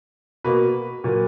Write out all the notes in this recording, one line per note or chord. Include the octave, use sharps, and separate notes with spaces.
B2 A#3 B4
A#2 F#3 A#3